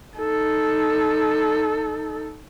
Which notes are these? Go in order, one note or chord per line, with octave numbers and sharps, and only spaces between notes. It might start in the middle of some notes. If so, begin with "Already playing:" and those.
D#4 A4